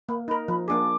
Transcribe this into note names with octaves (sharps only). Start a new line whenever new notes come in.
A#3 B5
D#4 A#4 B5
F3 B5
A#3 D4 G#4 D6